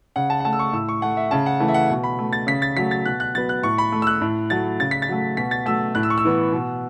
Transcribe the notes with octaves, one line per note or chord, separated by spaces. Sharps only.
C#3 F#5
A5
F#5
A3 A5
E6
C#6
A2 E6
C#6
A3 F#5
E5
C#3 A5
F#5
E3 A3
E5
F#5
B2
B5
A3
A6
C#3 B6
A6
F#3 A3 B6
A6
B2 F#6
F#6
F#3 B3 A6
F#6
A2 C#6
B5
A3
E6
F#6
A2
F#3 A3 A6
C#3 A6
B6
A6
F#3 A3
B2 B6
A6
F#3 A3 E6
A2 F#6
E6
C#6
E6
E3 B3
B2